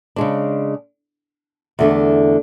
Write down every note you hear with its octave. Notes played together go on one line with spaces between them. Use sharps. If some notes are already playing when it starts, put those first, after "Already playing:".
C#3 G#3 D4
E2 D3 A3 D4